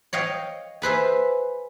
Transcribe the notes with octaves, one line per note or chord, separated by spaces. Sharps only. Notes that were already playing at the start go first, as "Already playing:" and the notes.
C#5 D#5 F5 G5
G#4 B4 C5 E5